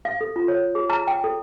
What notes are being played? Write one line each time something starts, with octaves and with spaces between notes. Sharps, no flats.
F5
A4
F4
C#5
G#4
A#5
G5
A4